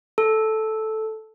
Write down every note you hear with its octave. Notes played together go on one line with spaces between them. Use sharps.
A4